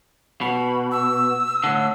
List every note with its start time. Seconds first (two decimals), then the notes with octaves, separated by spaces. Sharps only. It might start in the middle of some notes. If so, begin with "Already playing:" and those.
0.41 B2 B5
0.92 E6
1.64 A2 D3